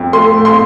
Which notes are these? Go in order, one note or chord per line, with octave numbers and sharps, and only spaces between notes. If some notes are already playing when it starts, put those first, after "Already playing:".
Already playing: F2
A3 C6
A2
C6